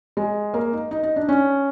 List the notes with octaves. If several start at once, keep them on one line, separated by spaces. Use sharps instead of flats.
G#3
A#3
D#4
D#4
D#4
D4
C#4